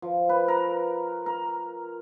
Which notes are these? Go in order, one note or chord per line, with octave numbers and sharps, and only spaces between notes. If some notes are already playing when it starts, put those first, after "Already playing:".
F3
B4
A#4
A#4